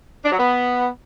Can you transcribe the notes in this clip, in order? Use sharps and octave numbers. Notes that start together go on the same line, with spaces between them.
D4
F#3
B3